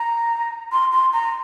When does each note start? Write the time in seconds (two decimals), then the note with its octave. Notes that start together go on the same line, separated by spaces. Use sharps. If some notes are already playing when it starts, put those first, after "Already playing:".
Already playing: A#5
0.72 C6
0.92 C6
1.12 A#5